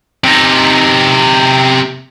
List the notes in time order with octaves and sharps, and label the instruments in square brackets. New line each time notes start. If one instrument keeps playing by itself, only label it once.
[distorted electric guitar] C3 D#4